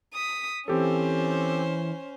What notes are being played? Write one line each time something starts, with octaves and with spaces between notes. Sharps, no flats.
D#6 B6
E3 C4 C#4 G4 A4 C5